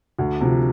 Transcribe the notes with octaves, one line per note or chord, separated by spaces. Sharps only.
D2
C3 F3